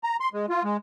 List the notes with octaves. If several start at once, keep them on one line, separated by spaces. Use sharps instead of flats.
A#5
C6
G#3
F4
G#3